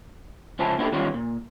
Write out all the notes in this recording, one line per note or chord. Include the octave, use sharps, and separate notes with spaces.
C#2 F3 C#4 E4 A5
A#3 B3 D4 E4 G4 A4
D#3 G3 B3 C#4 F4 C#5
A#2